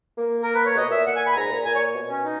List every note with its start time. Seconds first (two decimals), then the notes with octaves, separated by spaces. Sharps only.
0.17 A#3
0.43 A#4
0.54 B4
0.66 C#5
0.77 B2 D#5
0.91 A#2 E5
1.07 A#2 F#5
1.16 G#5
1.26 B5
1.32 G#5
1.36 G#2 A#5
1.51 A#2
1.65 A#2 G#5
1.75 C#5
1.95 B2
2.10 C#4
2.25 D#4